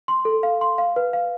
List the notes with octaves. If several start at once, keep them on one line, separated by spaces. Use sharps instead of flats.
C6
A4
F5
C6
F5
B4
F5